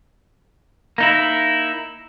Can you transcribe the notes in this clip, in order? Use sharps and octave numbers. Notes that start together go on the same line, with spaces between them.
A#3 D#4 E4